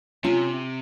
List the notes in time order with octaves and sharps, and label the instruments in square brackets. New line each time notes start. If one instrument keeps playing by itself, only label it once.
[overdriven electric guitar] C3 [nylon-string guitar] C#4 F4